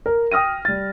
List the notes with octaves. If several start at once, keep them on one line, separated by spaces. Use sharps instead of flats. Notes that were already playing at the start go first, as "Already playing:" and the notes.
A#4
G5 D#6 F6 A#6 D#7
G3 A6